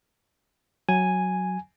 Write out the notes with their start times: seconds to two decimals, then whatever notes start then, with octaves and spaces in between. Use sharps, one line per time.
0.89 F#3 G#5